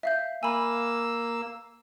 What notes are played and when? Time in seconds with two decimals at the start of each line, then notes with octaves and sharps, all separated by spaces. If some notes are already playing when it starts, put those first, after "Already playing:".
0.03 E5 F5 G6
0.43 A#3 G#5 B5 E6